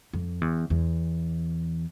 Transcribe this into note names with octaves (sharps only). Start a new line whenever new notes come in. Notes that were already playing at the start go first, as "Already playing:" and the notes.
F2
E2
E2